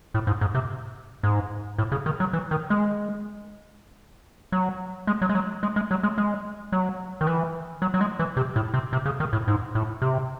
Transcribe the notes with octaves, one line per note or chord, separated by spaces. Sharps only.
A2
G#2
G#2
C3
G#2
A2
C#3
D#3
F#3
E3
D#3
G#3
F#3
G#3
F#3
G#3
F#3
G#3
G#3
F#3
G#3
G#3
F#3
D#3
E3
F#3
F#3
G#3
E3
C3
A2
C3
C3
C#3
D#3
A2
G#2
A2
C3